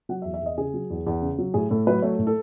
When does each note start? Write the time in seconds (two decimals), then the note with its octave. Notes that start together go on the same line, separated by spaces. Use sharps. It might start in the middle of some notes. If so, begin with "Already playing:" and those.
0.09 F#3 F#5
0.22 E5
0.25 E2
0.34 E5
0.42 E2 D#5
0.58 C#3 G#4
0.74 F#3
0.90 E2
1.07 E2
1.22 C#3
1.38 F#3
1.54 A2 G#4
1.71 A2 A4
1.87 F#3 B4
2.02 A3 C#5
2.19 A2
2.27 A4